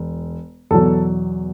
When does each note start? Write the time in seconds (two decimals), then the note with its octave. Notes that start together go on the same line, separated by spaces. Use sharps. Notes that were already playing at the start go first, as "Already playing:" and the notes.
Already playing: E1
0.71 E2 B2 F#3 A4